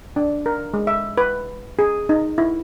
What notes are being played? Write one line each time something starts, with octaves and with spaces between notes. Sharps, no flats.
D4
A#4
G#3
E5
B4
G#4
D#4
E4